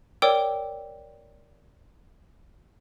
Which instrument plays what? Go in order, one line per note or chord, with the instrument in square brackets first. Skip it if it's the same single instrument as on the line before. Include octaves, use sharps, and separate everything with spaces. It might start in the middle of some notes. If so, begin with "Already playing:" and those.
[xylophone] A#4 C#5 D5 G5 D6 E6